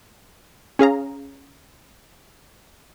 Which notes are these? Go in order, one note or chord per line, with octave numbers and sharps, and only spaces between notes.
C#4 G#4 F5 A#5